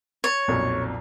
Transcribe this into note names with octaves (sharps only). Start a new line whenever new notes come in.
C#5 A6
B1 F2 A#2